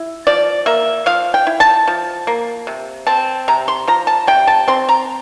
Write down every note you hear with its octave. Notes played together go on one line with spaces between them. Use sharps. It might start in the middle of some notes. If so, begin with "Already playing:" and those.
Already playing: E4
F3 D5
A#3 E5
F3 F5
G5
E4
A5
F3
A#3
C3
C4 A5
C3 A#5
C6
F3 A#5
A5
C3 G5
A5
C4 C6
A#5